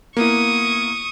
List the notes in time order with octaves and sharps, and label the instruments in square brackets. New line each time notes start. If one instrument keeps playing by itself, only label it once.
[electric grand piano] A#3 B3 E4 [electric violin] C#6 D#6